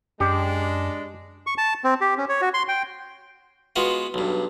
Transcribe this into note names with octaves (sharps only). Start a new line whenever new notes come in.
F#2 G#3 D4 G4
C#6
A5
C4
G4
C#4
C#5
F#4
C6
G5
G#3 B3 F4 F#4
B1 G2